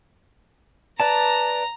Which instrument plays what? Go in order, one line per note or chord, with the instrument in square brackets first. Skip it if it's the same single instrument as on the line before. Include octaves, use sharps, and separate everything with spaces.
[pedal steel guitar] B4 D5 A5 [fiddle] A#5